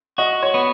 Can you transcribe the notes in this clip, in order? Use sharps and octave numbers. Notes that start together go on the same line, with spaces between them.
F#4 D#5
C#5
B3